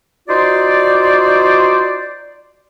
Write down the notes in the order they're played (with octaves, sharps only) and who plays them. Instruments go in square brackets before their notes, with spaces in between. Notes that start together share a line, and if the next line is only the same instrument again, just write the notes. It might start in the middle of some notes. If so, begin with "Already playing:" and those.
[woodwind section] D#4 F4 F#4 C5 D5